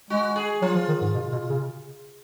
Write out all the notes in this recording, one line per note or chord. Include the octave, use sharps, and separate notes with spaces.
G#3 F#4
G#4
F#3 F4
F3
D#3
G#2
B2
B2
C#3